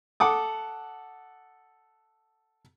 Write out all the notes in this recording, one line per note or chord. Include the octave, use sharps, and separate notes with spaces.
A4 F#5 D6 D#6